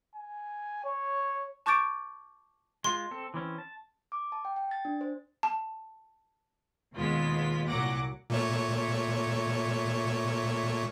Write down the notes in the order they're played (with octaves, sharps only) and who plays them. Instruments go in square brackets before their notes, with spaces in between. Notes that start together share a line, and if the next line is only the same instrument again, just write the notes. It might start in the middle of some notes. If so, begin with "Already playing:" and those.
[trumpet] G#5
C#5
[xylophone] A5 C#6 D6 G6 A6 D7
[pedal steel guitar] G#3 F4 [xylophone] C6
[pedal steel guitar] C4 A4
E3 C4 C#4
A5
[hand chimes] D6
A5
G5
G5
A6
D4
C5
[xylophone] A5
[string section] D#2 B2 G#3 F4 B6
C2 A#2 F#3 F#5 D6 A#6
[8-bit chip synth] A#2 A3 C#5